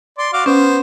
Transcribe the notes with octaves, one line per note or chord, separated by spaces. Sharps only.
D5 C6
F#4 F5 D6
B3 C#4 C5